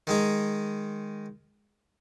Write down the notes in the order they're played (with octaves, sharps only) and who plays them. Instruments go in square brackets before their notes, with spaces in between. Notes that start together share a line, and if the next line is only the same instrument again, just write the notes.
[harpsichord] D#3 G#3 D#4